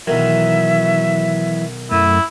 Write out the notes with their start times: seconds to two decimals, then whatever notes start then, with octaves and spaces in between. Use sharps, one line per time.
0.07 B1 D#3 E3 F#3 E5
1.91 F#2 A3 E4